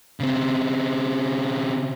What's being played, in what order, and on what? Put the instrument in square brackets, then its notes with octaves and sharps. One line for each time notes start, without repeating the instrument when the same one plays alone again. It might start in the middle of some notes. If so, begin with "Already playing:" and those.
[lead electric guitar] C#3 C4